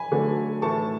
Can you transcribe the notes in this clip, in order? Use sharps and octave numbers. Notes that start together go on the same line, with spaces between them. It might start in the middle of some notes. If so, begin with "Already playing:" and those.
Already playing: G#5 B5
D3 F#3 A3
A2 E3 A3 A5 C#6